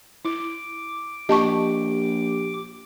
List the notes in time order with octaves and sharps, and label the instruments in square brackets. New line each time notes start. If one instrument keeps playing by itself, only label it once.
[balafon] E4 [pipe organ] D6
[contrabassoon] A#1 [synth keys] G4 [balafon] D#5 A5 C#6